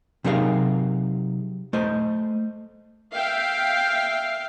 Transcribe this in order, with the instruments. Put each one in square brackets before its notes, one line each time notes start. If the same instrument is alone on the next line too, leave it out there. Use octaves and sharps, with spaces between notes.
[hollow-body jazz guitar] C3 F#3 D#4 G#4 A#4 F5
A3 C5 D#5
[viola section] E5 F5 G5